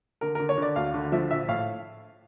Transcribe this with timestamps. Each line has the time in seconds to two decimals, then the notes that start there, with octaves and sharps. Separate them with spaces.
0.21 D3 A#4
0.35 D3 A#4
0.49 C#5
0.58 D3 D5
0.76 D2 F5
0.94 D3
1.12 F3 E5
1.31 A#1 E5
1.48 A2 F5